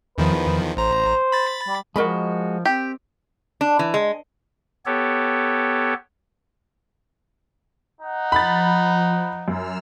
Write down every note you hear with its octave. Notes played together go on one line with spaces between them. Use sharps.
E2 D#3 F3 B4
A1 C5 A#5
B5 A6
G3
F3 G#3 F#4 A#4 D#5 B5
C4 G4
D4
E3
G#3
B3 G4 A4 C#5
D#4 F#5
F3 B5 A6
F#2 E6 F6